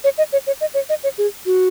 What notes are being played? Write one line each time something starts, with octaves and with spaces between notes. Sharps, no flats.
C#5
D#5
C#5
C#5
D#5
C#5
D#5
C#5
G#4
F#4